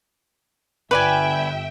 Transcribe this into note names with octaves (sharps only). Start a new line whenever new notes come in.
G1 B4 D5 E5 G5 G#5